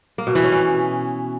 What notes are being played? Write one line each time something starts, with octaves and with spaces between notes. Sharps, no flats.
A#3
B2
E3
C#4
B2